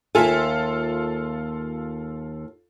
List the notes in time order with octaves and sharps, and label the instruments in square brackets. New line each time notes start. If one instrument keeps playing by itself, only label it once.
[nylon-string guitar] D#2 E5 G#5 [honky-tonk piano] F4 A4